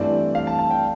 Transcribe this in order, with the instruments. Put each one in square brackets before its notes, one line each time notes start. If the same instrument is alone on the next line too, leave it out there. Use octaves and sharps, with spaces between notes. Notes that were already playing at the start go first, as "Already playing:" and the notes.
Already playing: [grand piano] G2 E3 A3 C4 D5
F5
A5
A5
G5